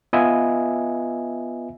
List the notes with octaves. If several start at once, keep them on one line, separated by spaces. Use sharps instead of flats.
B3 F4 B4 D#5 E5 G#5